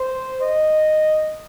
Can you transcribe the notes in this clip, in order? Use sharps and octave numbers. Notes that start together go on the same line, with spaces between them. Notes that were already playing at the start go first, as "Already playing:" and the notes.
Already playing: C5
D#5